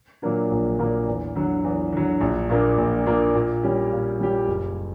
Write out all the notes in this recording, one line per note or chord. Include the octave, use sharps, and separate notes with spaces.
A#2 F#3 A#3 D4
A#1
A#2 F#3 A#3 D4
E2
D3 F#3
E2
D3 F#3
A#1
A#2 A#3 D4
A#1
A#2 A#3 D4
A#2
G3 C#4 G4
A#2
G3 C#4 G4
F#1